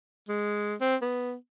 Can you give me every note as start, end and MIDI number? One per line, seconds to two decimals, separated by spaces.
0.28 0.74 56
0.81 0.95 60
1.02 1.34 59